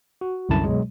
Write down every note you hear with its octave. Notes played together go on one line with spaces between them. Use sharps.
F#4
C2 F#2 D3 E4 A5
B2 F#3 G#3